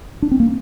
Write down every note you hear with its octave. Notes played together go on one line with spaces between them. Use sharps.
D4
C4
A#3